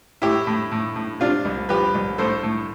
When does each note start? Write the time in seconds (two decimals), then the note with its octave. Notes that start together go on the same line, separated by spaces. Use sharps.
0.22 A2 E4 G4
0.47 A2
0.71 A2
0.96 A2
1.20 C3 D4 F4
1.45 C2
1.69 F3 G4 B4
1.95 C2
2.18 A2 A4 C5
2.43 A2